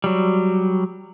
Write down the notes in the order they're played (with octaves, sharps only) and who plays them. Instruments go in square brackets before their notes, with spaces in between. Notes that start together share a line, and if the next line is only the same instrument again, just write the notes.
[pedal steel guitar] F#3 G3